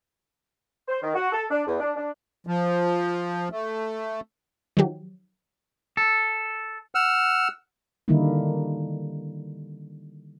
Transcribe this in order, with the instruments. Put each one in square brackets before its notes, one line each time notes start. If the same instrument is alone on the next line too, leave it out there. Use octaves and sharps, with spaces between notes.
[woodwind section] C5
D#3
F#4
A4
D4
E2
D4
D4
[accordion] F3
A3
[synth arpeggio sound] D#3 F3 F#3 G4
[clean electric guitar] A4
[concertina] F#5 E6 F6
[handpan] D3 D#3 G3 A#3 D#4 E4